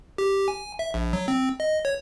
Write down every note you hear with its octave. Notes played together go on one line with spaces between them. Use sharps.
G4
G#5
E5
A#1
F#3
C4
D#5
C#5